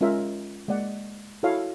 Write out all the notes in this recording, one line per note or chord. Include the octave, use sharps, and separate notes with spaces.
G#3 C#4 F4 A#4 E5
G#3 A#3 D5 F#5
E4 F#4 A4 C#5 F5